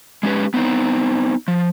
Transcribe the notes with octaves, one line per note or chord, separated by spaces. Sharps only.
G#3 C#4 G4 B4
B3 C4 D#4
F3